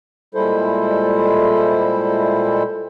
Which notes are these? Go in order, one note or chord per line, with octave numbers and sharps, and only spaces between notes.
A#2 G3 G#3 E4 A4 C5